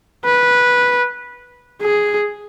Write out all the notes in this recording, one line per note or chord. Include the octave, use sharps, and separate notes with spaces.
B4
G#4